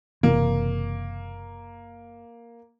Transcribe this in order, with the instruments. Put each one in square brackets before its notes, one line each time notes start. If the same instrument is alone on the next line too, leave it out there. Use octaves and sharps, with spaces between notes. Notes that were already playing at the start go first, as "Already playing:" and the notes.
[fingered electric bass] F#1 C3 E3 [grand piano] A#3